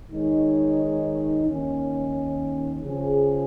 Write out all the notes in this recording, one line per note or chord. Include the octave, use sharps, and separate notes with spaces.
D#3 G#3 D#4 C#5
D#2 D#3 C#4
C#3 F3 C#4 G#4